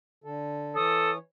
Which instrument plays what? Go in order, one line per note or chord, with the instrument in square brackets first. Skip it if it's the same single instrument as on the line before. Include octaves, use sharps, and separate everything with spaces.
[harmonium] D3 A4
[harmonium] E3 C#5 [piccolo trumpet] A4 [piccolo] D#6